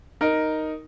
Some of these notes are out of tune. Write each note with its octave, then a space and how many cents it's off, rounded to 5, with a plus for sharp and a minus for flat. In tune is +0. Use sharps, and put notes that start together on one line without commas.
D#4 +0 A#4 +0